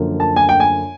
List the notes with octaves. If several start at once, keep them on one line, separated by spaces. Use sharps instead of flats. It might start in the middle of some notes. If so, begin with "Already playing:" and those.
Already playing: F#2 D3 F3 A#3
A5
G#5
G5
G#5